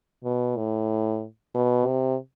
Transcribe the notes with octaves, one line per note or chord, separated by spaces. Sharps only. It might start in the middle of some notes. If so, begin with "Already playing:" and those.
B2
A2
B2
C3